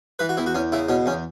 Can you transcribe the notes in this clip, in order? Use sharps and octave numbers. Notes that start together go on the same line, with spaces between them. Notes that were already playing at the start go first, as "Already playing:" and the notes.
E3 B4
F#4
E2 E4
F#4
E2 C#4
C#3 E4
B2 C#4
E2 C#4